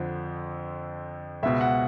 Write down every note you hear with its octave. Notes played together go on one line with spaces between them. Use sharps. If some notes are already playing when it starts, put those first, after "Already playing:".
Already playing: F2 D3 F3
C#2 B2 E5
F#5